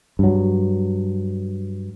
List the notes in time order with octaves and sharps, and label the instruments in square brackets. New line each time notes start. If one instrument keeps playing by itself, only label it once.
[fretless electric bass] G2 F#3